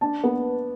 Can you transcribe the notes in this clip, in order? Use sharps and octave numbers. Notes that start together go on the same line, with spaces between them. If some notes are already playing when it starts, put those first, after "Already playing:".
D4 A5
B3